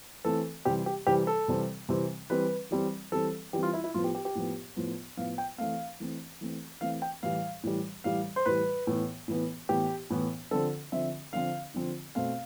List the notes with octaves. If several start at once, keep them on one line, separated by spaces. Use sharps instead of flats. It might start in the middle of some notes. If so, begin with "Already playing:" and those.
E3 A3 C4 A4
C3 E3 G3 C4 G4
G4
C3 E3 G3 C4 G4
A4
C3 E3 G3 C4
C3 E3 G3 C4
E3 G3 C4 B4
E3 G3 C4
E3 G3 C4 A4
E3 G3 C4 G4
F4
E4
E4
A2 F3 B3 F4
G4
G4
G4
A2 F3 B3
A2 F3 B3
A2 F3 B3 F5
G5
E3 A3 C4 F5
E3 A3 C4
E3 A3 C4
E3 A3 C4 F5
G5
A2 E3 G3 F5
A2 E3 G3
A2 E3 G3 F5
C5
A2 E3 G3 B4
A2 E3 B3
A2 E3 B3
A2 E3 B3 G4
A2 E3 B3
D3 F3 C4 A4
D3 F3 C4 E5
D3 F3 C4 F5
D3 F3 C4
B2 A3 C4 F5